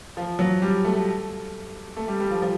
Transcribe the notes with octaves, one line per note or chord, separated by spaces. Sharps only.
F3
F#3
G3
A3
A3
G3
G3
F3
F3